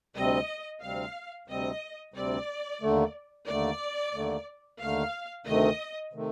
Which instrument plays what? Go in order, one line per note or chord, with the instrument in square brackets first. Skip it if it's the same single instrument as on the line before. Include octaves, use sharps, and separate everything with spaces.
[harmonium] D2 C3 G3 C4 [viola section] D#5
[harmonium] D2 C3 G3 C4 [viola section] F5
[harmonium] D2 C3 G3 C4 [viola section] D#5
[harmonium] D2 C3 G3 C4 [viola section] D5
[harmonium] D#2 D3 A3
[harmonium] D#2 D3 A3 [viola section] D5
[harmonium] D#2 D3 A3
[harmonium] D#2 D3 A3 [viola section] F5
[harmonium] D2 C3 D#3 A3 [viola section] D#5
[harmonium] C3 D#3 A3